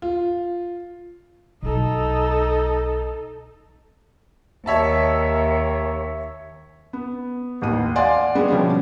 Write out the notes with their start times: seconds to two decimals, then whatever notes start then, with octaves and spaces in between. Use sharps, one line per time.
0.02 F4
1.63 B1 D#4 A4
4.66 D#2 C#5 E5 A5
6.93 B3
7.62 A1 D#2 D#7
7.96 D5 F5 F#5 G#5 C6
8.35 G3 G#3 B3 D4
8.49 B2 F3 G3 C#4 G#4